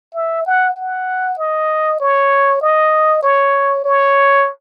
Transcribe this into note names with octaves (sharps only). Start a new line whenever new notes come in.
E5
F#5
F#5
D#5
C#5
D#5
C#5
C#5